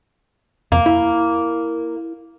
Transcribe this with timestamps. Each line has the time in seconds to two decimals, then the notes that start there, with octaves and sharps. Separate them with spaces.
0.72 F2 A#3
0.86 E4